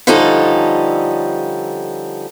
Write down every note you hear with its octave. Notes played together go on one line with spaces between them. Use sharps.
D3 F3 G3 C#4 D#4 A4